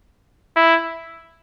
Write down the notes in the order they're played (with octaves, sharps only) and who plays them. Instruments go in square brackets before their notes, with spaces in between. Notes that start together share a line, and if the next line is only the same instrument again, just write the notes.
[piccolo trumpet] E4